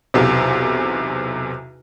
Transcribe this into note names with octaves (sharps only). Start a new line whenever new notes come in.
B1 E2 C3